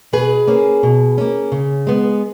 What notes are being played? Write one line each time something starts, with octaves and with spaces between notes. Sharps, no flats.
B2 G#4 B4
A#3 C#4
B2
A#3 C#4
C#3
G#3 B3